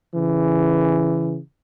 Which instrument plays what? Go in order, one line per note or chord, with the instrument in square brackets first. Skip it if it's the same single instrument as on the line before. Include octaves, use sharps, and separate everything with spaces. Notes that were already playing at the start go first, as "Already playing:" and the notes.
[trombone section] C#3 E3